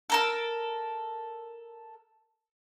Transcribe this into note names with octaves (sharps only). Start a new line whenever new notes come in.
A4 A#4 E6